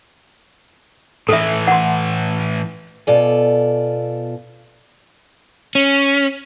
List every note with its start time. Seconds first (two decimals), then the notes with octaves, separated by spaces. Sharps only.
1.29 A2 E3 A4 E5
1.68 F#5 C6
3.07 B2 F4 A4 D5 G#5
5.75 C#4